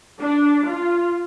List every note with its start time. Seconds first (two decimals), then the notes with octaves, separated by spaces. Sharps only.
0.21 D4
0.68 F4